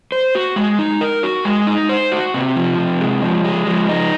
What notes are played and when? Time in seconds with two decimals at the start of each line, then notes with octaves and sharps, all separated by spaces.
0.12 C5
0.35 F#4
0.56 G#3
0.79 D#4
1.01 A#4
1.23 F#4
1.45 G#3
1.67 D#4
1.89 C5
2.12 F#4
2.34 C3
2.56 F3
2.78 C3
3.00 G#3
3.22 F3
3.45 G#3
3.67 F3
3.89 D#4